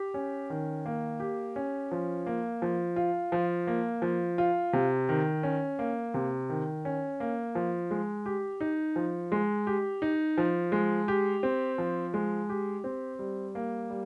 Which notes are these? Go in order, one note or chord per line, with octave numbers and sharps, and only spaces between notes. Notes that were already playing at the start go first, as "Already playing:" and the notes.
Already playing: G4
C#4
D#3
A#3
G4
C#4
F3
A#3
F3
F4
F3
A#3
F3
F4
C3
D#3
C#4
A#3
C3
D#3
C#4
A#3
F3
G#3
G4
D#4
F3
G#3
G4
D#4
F3
G#3
G4
C4
F3
G#3
G4
C4
G3
A#3
G3